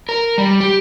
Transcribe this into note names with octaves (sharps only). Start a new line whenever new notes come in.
A#4
G3
G4